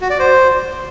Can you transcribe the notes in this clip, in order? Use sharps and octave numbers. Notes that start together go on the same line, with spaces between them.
F#4
D5
C5